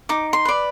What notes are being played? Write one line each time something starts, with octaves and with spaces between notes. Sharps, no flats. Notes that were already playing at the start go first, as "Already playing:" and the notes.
D#4 D6
C6
B4 D5